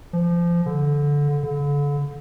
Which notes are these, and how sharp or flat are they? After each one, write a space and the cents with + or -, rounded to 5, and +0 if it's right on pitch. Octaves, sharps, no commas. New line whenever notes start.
F3 -25
D3 -15
D3 -35